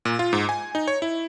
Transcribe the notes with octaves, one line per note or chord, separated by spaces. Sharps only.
A#2
F4
G#2
G#5
D#4
C#5
E4